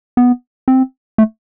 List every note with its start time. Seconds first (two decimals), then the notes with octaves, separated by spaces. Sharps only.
0.17 B3
0.68 C4
1.18 A3